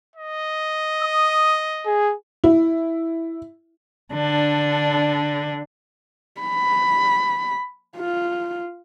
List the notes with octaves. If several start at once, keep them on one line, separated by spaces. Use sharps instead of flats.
D#5
D#6
G#4
E4
D3 D4
B5
F4